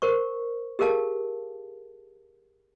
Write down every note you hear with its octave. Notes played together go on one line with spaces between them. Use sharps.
A#4 C5 C#6
G4 G#4 A#4 F5 A5